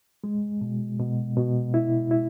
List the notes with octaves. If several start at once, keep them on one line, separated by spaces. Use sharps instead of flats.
G#3
B2
B2
B2
E4
E4